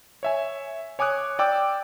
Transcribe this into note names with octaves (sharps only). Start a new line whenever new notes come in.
C#5 E5 G#5
C#5 G#5 D6 D#6 F#6
D5 G5 D6 E6